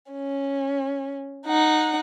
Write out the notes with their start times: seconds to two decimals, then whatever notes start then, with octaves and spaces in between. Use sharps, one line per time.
0.12 C#4
1.46 D#4 F#5